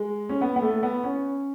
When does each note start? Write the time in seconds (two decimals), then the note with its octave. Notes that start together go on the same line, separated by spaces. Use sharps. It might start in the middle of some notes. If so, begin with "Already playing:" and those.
Already playing: G#3
0.29 C#4
0.41 B3
0.56 B3
0.62 A3
0.83 B3
1.04 C#4